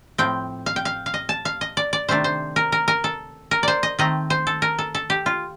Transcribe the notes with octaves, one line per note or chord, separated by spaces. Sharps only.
A2 F3 C4 G5
F5
G5
F5
F5
D#5
A5
F5
D#5
D5
D5
C3 D#3 A3 D4 C5
C5
A#4
A#4
A#4
A4
A#4
C5 D5
D#5
D#3 A3 C4 D#5
C5
A4
A#4
A4
A4
G4
F4